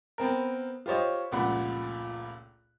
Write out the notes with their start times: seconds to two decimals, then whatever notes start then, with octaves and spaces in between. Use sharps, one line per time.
0.18 B3 C4 A#4
0.86 F4 G4 C5 C#5 D#5
1.32 F1 C#2 A#2 F#5 B5